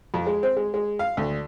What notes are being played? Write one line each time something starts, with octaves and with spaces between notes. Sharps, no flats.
F2
G#3
C4
G#3
G#3
F5
D2